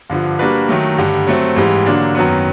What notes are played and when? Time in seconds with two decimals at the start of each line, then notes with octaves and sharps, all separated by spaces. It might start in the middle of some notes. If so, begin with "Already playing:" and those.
0.10 G2 D3 F3
0.39 G3 A#3 D4 F#4 B4
0.69 D#3 F#3 A3
0.98 G2 D3 G3
1.27 F#3 A3 C4
1.56 G#2 E3 G3
1.86 D3 F#3 A#3 D4
2.15 F#2 D#3 F#3 B3